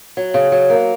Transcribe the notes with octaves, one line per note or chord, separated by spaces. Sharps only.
F#3
C#3
F#3
A#3